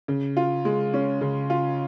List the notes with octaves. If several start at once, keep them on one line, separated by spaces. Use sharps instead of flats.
C#3
F4
G#3
C#4
C#3
F4